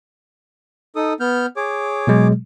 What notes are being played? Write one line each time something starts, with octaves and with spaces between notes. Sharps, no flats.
D#4 A4 D#6
B3 F6 G6
G#4 C#5 D6
B2 F#3 G#3